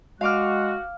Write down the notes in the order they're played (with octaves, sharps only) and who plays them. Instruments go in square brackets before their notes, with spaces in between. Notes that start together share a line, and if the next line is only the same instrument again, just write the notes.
[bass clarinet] G#3 [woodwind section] F#4 [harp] F5 D6 F6